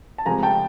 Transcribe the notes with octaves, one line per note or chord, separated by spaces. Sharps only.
A5
C#2 C3 F3 A3 G#5 A#5
G5 A5